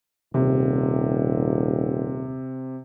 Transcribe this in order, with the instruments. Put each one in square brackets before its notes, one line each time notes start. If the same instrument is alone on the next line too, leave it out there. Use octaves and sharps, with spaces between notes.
[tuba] D#1 [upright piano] C3